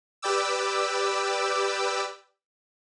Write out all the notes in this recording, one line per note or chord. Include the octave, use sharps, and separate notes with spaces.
G4 B4 D5 G5 D6 E6